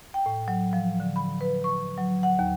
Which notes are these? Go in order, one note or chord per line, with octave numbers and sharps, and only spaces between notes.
G5
A2
F#3
F3
D3
B5
B4
C#6
F#3
F#5
D#2